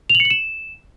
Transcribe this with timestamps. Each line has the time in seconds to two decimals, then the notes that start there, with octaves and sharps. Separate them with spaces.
0.10 F7
0.15 F#7
0.20 C#7
0.25 F#7
0.30 E7